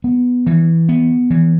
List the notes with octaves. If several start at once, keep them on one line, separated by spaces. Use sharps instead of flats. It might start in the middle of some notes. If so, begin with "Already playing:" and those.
B3
E3
B3
E3